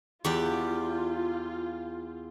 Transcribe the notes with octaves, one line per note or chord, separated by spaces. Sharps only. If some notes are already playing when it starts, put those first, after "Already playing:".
E2 F4 G4 D5